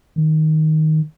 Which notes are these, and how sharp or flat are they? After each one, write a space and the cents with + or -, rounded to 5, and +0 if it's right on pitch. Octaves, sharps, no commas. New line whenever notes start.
D#3 +5